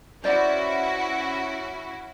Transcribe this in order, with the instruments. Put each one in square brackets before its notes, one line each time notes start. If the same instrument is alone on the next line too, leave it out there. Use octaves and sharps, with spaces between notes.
[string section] C#4 E4 F#4 [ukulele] C5 D5 E5